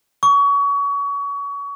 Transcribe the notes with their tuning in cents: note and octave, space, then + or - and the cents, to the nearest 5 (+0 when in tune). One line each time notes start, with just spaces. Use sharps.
C#6 +30